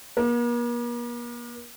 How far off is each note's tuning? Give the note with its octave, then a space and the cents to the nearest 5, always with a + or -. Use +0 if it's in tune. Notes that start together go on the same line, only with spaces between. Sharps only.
A#3 +45